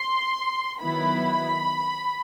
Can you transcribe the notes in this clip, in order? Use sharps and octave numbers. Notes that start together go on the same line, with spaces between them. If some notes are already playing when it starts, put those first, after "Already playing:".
Already playing: C6
D#3 F#3 B3 E4 B5